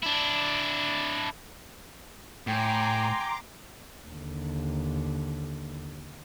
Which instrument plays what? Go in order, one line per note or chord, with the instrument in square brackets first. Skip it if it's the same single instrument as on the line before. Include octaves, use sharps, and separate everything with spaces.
[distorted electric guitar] D4 E4
[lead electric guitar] A2 [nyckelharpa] G5 G#5 [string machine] A#5 C6 D6
[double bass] D#2 D3